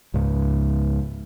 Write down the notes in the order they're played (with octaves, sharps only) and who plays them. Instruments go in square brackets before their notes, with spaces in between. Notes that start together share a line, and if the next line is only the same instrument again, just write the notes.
[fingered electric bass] C#2 G#2